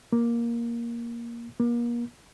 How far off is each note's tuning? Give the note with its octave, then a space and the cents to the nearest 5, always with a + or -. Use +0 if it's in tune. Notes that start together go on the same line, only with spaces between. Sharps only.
A#3 +10
A#3 +35